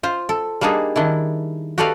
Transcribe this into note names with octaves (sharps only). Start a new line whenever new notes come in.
F4 C5
A4
G3 A#3 D4 D#4 G#4
D#3 D4 E4
F#4 G4 A4 B4 D5 F5